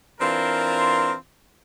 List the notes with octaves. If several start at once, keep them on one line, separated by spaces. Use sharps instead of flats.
E3 C4 D4 F4 A#4